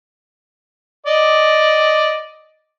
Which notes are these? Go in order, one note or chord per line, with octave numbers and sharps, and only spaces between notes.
D5 D#5